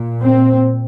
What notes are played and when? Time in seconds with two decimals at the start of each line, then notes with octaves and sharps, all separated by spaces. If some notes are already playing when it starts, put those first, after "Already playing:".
Already playing: A#2
0.21 C4